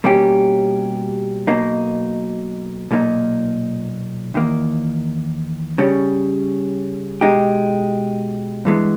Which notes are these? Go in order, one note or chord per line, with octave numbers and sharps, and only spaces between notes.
B2 G3 A#3 C#4 G4
B1 B2 A#3 D#4
B1 A#2 A#3 D#4
E2 D#3 A#3
C#3 G3 C#4
B2 G#3 D#4 G4
G2 E3 G#3 B3